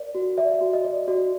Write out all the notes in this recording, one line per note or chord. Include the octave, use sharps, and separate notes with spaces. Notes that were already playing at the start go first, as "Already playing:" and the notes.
Already playing: A#4 D5
F#4
D5 E5
F#4
D#5
D5
F#4 D5